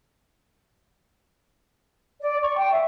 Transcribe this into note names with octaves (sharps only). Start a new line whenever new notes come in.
D5
C#6
G5
E5